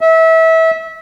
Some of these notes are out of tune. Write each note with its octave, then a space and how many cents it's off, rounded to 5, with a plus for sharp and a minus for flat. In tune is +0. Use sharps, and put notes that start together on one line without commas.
E5 -25